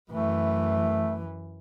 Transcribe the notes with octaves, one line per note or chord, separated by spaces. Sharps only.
F#2 E3 A3